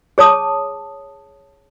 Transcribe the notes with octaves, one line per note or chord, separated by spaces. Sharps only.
G#4 C#5 A5 D#6